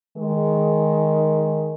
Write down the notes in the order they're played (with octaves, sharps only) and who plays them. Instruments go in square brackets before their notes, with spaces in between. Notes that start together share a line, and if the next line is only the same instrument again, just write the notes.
[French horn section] D#3 G#3